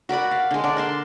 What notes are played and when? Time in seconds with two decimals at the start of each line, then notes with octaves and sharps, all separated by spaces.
0.09 F#4 A#4 D5 B5
0.31 F5
0.51 D3 G#3
0.64 D4 D5
0.77 A#4 A5 C6